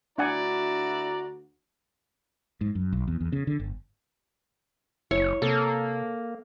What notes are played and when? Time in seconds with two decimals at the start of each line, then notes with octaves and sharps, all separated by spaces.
0.18 D2 D4 E4 F#4 D5 F#5 G#5 A#5
2.61 G#2
2.75 F#2
2.92 B1
3.07 E2
3.21 E2
3.32 C#3
3.47 D3
3.60 G1
5.11 F#1 E4 C#5
5.42 C3 A#3 A4